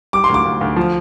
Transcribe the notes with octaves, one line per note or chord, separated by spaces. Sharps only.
G3 D6
C6
D2 D6
D2
D2
F3